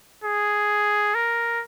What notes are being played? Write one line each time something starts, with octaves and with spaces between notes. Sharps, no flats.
G#4
A#4